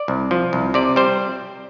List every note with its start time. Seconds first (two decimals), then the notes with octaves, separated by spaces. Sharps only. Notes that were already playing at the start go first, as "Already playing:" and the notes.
Already playing: D5
0.08 C2
0.31 F3
0.53 C2
0.74 C3 D5
0.96 G3 C5